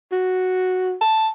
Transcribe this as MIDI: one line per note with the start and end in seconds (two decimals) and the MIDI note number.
0.12 0.95 66
1.01 1.30 81